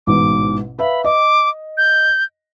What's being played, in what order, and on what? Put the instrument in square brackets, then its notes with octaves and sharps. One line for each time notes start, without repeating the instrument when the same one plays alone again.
[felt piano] A1 G#2 B2 [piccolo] D6
[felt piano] B4 E5 F5 [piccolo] B5
[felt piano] D#5 [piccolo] D6
[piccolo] G6